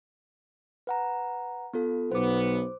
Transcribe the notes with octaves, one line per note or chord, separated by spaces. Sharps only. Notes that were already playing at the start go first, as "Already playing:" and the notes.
B4 F#5 A#5
B3 F4 A4
B1 B3 C5 D6